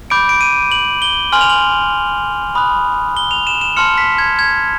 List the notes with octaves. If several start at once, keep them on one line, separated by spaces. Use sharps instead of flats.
B5 D6 G6 D7
D7
D#7
F#7
G7
G#5 C6 F6 F#7
F7
F#7
B5 D#6 F#6
G7
F7
E7
E7
A5 C6 F6 C#7
B6
G#6
G#6